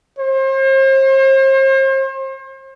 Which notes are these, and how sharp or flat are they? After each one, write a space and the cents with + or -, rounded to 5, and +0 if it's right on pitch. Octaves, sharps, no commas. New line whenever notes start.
C5 +40